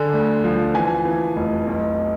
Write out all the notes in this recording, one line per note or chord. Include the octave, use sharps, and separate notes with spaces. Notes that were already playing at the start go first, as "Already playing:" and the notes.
Already playing: D3 G#5
D2
F3
E3 G#5
E3
F1
B1